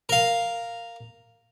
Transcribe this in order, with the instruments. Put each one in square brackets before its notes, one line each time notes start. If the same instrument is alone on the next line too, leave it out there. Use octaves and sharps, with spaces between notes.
[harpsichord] A#4 F5